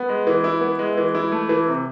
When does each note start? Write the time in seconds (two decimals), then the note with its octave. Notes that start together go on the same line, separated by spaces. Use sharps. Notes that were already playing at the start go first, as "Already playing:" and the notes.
Already playing: B3
0.09 G#3
0.27 E3
0.44 E4
0.61 B3
0.79 G#3
0.97 E3
1.15 E4
1.32 A3
1.49 E3
1.67 C3